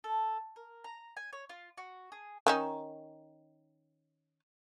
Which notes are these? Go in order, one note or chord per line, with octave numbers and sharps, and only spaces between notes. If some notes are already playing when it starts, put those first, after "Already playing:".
A4
A#4
A#5
G#5
C#5
F4
F#4
G#4
D#3 C#4 D#4